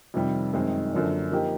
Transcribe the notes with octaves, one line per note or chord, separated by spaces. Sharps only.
F2 C3 D#3 G3
F#2 D#3 G#3 C4 D#4
F#2 D3 F3 A#3 D4
F3 A#3 D#4 G4